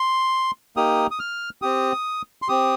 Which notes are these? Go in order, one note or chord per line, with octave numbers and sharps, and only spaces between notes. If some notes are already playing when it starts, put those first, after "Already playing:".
Already playing: C6
A#3 D#4 G4 D#6
D#6
F6
C4 G4 D#6
C6
C4 G4 D#6